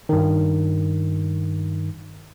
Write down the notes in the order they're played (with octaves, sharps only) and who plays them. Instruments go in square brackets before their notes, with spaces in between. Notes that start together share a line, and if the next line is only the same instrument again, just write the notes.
[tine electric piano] G2 D#3